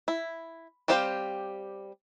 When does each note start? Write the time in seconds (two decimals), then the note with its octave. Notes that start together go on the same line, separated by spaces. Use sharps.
0.08 E4
0.88 G3 C4 G4 C5 F5